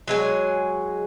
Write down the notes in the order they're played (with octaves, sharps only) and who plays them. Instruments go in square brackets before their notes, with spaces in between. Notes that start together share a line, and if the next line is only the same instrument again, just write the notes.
[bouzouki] F#3 G#3 G#5